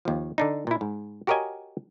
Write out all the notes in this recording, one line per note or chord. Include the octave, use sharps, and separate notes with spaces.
D#2 F3
D3 D4 D#4
A#2 E4
G#2
F#4 G4 A#4 C#5 D#5 G#5